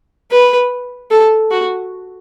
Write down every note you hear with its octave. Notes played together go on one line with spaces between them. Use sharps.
B4
A4
F#4